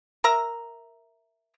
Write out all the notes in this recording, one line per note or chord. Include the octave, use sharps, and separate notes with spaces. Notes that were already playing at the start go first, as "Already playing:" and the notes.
A#4 E5 A#5